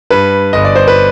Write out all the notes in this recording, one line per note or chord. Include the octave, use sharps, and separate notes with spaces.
G2 B4
G1 D#5
D5
C5
B4